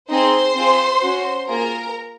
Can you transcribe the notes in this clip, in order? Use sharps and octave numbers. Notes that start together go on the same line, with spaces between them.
C4 D#4 G#4 C5 C6
C4 F4 G#4
C#4 F#4
A#3 F4 G#4 A#4 A#5